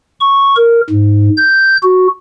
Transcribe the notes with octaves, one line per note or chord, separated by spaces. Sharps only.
C#6
A#4
G#2
G6
F#4